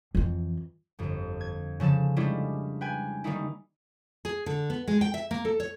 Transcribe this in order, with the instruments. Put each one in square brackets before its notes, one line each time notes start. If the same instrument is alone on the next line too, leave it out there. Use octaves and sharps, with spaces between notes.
[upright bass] F2 E3
[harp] G1 F2
G#6
C#3 F3 A4 E7
G3 G#3 C#4 D4 E4 F4
B4 G5 G#5
D#3 G3 A#3 C#4 D#4 E4
[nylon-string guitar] G#4
D3
B3
G#3
G5
E5
A#3
A4
C#5